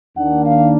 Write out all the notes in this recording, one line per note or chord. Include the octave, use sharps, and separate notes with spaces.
D#2 D#3 A#3 D4 F#5
F5